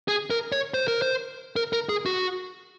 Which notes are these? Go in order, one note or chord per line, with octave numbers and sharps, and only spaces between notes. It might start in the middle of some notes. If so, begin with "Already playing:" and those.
G#4
A#4
C#5
C5
A#4
C5
A#4
A#4
G#4
F#4